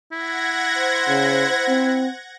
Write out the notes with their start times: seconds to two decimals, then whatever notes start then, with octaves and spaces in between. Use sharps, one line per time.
0.12 E4 F#5 G#6 A#6
0.79 C5
1.08 C#3
1.67 C4